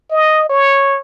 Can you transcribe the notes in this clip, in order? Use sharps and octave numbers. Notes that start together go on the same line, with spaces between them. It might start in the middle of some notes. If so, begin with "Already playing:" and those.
D#5
C#5